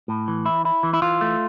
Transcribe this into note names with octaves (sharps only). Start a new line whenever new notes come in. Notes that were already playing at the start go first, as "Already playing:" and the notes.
A2
E3
E4
E4
E3
E4
E3 F4
A3